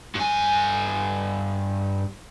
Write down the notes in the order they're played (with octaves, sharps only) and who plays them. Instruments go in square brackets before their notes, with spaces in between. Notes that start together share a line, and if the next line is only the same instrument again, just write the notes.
[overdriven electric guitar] G2 G#5